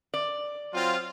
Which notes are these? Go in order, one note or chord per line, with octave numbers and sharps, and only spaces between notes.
D5
F#3 C4 F4